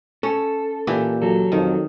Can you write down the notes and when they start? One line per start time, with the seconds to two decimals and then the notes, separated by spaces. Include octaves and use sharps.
0.23 C#4 A4
0.87 A#2 E3 G4
1.22 F#3 A4
1.52 F2 D#3